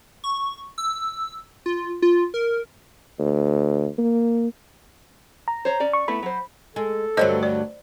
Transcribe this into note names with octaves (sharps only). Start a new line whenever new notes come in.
C#6
E6
F4
F4
A#4
D2
A#3
A#5
C5 C#5
C#4 D5
C#6
A3 B3 E4 B5
F#3 C5
G#3 A4
D2 G2 F#3 C5 D#5
D5